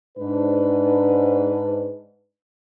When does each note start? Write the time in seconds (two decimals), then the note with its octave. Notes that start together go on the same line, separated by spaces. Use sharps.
0.18 G#2 D4 B4